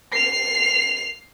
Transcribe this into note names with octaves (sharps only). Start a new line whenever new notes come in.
C7 F7